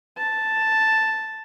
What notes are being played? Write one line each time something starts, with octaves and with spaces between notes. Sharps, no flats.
A5